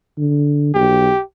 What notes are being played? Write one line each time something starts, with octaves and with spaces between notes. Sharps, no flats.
D3
B1 G4